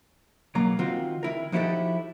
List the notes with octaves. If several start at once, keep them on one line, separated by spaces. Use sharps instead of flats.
B1 F#3 A#3 A#5
D#3 C4 F4 F#4
D#3 E4 A#4
F3 D#4 E4 F#4 G4 A4